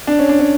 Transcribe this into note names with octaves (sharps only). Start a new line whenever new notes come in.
D4
C#4
D4
C#4